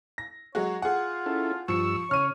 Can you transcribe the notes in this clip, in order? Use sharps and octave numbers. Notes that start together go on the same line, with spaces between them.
A#6
F#3 G#3 F#4 C#5
F4 G#4 F#5
C#4 E4 A4
G2 F3 C#6 E6 C#7
C#3 C#5 F6 D#7